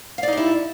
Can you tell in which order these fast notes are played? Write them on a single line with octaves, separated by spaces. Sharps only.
F5 D5 D#4 G4 E4